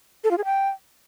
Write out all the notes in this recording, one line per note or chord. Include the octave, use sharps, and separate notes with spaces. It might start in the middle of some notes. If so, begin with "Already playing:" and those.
A4
F4
G#4
G5